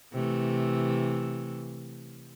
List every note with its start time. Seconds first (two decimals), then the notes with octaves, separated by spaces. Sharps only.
0.13 C3 E3 A3